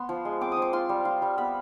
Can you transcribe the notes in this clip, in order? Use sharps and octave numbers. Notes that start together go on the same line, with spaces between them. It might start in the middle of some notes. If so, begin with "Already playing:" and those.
Already playing: B3 C6
F3
G#3
C4 D6
D#6
F3
D6
F4 C6
G3
F4
G3
B3 B5